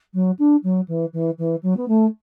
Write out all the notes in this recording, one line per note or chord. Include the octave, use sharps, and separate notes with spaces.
F#3
D4
F#3
E3
E3
E3
F#3
B3
A3